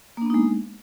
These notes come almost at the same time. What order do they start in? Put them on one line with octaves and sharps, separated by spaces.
A#3 D4 B3 D#4 G#3